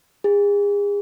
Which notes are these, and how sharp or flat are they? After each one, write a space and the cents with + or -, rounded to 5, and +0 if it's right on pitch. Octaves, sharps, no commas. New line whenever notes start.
G#4 -35